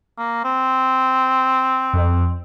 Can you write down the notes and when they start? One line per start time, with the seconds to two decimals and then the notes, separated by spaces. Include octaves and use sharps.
0.18 A#3
0.45 C4
1.93 F2